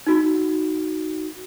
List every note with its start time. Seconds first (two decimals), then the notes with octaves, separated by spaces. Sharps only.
0.07 D#4 F#4